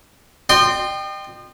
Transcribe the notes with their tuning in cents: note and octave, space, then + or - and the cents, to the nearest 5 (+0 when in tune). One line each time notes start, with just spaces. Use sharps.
D#5 -40 G5 +0 C6 +0